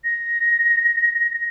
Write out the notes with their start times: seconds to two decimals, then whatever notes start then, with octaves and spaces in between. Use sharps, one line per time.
0.04 A#6